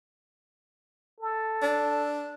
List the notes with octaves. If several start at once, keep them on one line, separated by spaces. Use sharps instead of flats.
A4
D4